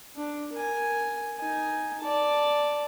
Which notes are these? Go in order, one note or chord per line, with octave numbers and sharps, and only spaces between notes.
D4
A#4 G#5
D#4 G#5
D5 A5